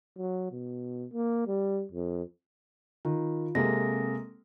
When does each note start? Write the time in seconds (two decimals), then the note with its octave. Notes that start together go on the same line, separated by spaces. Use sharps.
0.18 F#3
0.52 B2
1.13 A#3
1.47 G3
1.92 F2
3.05 D#3 F4
3.55 C3 G#3 A#3 C4 A4 A#6